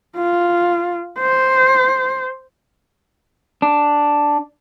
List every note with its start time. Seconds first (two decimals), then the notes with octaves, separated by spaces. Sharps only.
0.17 F4
1.19 C5
3.62 D4